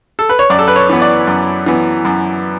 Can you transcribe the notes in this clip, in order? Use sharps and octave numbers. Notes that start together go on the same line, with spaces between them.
A4
B4
C#5
F#2 D5
A4
B4
C#5
E3 B3
D5
F#2
E3 B3
F#2